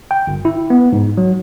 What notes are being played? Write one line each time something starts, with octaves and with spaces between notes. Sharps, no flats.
G5
G1
E4
B3
G#2
F#3